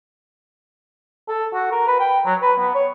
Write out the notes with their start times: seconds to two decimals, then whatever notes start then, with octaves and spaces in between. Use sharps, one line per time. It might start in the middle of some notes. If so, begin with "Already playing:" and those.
1.29 A4
1.54 F#4
1.72 A#4
1.87 B4
2.00 G5
2.25 F#3
2.42 B4
2.59 B3
2.75 C#5